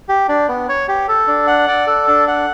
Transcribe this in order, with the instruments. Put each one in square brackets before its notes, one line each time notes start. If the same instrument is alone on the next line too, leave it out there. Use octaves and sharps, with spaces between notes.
[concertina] G4
D4
B3
C#5
G4
A4
D4
F#5
D5
A4
D4
F#5